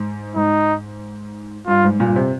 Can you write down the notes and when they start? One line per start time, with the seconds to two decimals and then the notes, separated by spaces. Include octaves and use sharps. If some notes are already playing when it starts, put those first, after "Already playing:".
Already playing: G#2
0.36 G#2 D#4
1.67 G2 F4
1.84 G#2
2.00 G2 A#2
2.16 C3